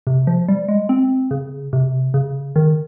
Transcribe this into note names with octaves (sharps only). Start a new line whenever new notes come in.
C3
F3
G3
G#3
C4
C#3
C3
C#3
D#3